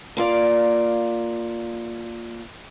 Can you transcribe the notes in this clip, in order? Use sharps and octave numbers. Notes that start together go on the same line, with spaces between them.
A#3 F4 D5